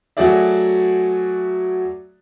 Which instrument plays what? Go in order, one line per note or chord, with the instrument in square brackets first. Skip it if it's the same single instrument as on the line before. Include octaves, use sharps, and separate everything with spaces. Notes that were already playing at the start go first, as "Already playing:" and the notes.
[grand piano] F#3 A3 F#4 G#4 D5 E5